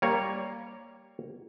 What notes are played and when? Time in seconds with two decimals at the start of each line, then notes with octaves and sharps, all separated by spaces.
0.02 G3 A#3 C#5